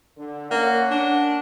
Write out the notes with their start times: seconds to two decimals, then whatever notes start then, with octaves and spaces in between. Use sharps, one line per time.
0.17 D3
0.51 A#3 C#4 F#5
0.91 D4